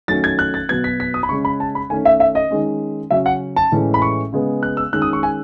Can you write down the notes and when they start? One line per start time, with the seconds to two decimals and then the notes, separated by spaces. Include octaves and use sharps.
0.08 D#3 F#3 A3 C#4 A6
0.24 G#6
0.39 F#6
0.54 A6
0.69 B2 F#3 B3 G#6
0.84 B6
1.00 B6
1.14 D#6
1.23 B5
1.29 C#3 G#3 C#4 C#6
1.45 B5
1.60 A5
1.75 B5
1.90 D#3 A3 C#4 G#5
2.05 E5
2.20 E5
2.35 D#5
2.51 D#3 G#3 C#4
3.11 C#3 F#3 C#4 E5
3.26 F#5
3.56 A5
3.72 A2 E3 G#3 C#4
3.94 B5
4.02 C#6
4.32 C#3 G#3 B3
4.63 F#6
4.77 E6
4.93 D#3 G#3 C#4 F#6
5.02 D#6
5.13 C#6
5.23 G#5